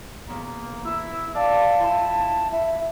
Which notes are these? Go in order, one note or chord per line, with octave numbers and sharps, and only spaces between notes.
E2 B2 A#3
E4 E6
D5 F5 A5
F2 E4 G5 C6
E4 E5